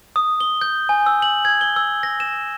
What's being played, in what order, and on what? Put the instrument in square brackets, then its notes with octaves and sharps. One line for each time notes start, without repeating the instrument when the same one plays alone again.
[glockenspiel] D#6
G7
G6
G#5
E6
F#7
G#6
G7
E6
A#6
E7